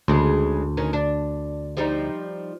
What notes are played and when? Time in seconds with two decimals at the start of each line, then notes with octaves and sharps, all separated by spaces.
0.08 D2 C#3 G#3
0.77 D#3 C#4
0.93 D4
1.77 F3 G3 D#4